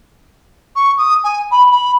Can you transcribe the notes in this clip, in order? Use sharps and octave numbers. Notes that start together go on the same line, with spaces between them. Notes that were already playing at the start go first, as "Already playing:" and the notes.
C#6
D#6
G#5
B5
B5